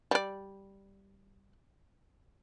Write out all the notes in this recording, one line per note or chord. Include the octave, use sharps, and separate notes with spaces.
G3 D5